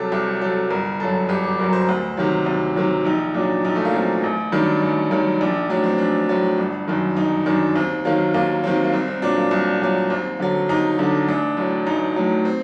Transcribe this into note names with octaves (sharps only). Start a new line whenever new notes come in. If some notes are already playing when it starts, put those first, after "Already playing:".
Already playing: C2 C3 F#3 G4 A4
C2 G4
C3 F#3 A4
G1 A#4
F#2 F#3 A4
G1 G4
G4
F#2 F#3 A#4
A#4
C5
D2
C3 D#3 F#3
D2
C3 D#3 F#3
A#1 D#4
A#2 F#3 D4
A#1 D#4
A3
A#3
A#2 F#3 C4
A1
G2 D#3 F#3 D4
A1
G2 D#3 F#3
A#1 D4
A2 F#3 D4
C4
A#1 D4
A2 F#3
G1
F#2 D#3
G1 D#4
F#2 D#3 D4
D#2 C4
D#3 F#3 A#3
D#2 A#3
D#3 F#3 C4
A#3
C2 C4
C4
A#2 F#3 D4
A#3
C2
A#2 F#3
D#2 C4
D3 F#3
D#2 D#4
D3 F#3 D4
A1 D4
A2 F#3
A1 D#4
A2 F#3
C4